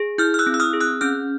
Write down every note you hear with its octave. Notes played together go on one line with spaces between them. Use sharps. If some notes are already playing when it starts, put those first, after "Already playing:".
Already playing: G#4
E4 F6 G6
F6
E6 F#6
C4
E6
D#6 F6
G#4
E6 F#6
C#4 F6 G6